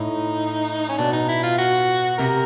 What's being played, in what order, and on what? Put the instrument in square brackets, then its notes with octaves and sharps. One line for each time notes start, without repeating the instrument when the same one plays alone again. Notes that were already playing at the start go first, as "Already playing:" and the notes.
Already playing: [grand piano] A2 [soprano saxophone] D#4
[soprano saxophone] C#4
[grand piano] B2 [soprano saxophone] D4
[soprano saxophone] D#4
E4
F4
F#4
[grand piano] C3 [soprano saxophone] A#4